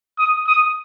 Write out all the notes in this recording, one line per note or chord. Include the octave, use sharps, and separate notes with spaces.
D#6
D#6